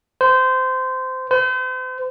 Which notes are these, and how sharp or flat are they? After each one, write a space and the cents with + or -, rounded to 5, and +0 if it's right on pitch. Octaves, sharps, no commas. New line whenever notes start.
C5 -20
C5 -40